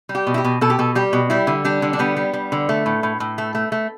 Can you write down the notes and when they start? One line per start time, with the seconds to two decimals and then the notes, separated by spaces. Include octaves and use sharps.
0.09 G3
0.15 G4
0.27 B2
0.34 E4
0.38 G4
0.44 B2
0.61 B2 A4
0.70 G4
0.79 B2 A4
0.95 G3 G4
1.13 B2
1.30 G3 E4
1.47 D3
1.65 G3 D4
1.82 D3
1.93 D4
1.99 G3 B3
2.16 G3
2.33 G3
2.52 D3
2.69 A3
2.86 A2
3.03 A2
3.20 A2
3.38 A3
3.55 A3
3.72 A3